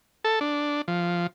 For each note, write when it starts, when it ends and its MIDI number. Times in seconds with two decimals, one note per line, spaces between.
0.24 0.39 69
0.41 0.82 62
0.88 1.27 53